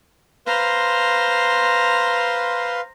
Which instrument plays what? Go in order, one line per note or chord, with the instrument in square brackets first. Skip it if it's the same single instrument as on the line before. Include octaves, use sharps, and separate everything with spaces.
[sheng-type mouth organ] B4 F5 C6 [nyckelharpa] C5 A#5